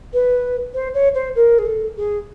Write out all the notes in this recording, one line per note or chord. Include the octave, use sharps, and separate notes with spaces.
B4
C5
C#5
C5
A#4
G#4
A4
G#4